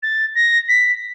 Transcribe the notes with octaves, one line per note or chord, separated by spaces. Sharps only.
A6
A#6
B6